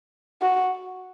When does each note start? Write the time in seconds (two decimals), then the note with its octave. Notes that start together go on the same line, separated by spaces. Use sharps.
0.42 F#4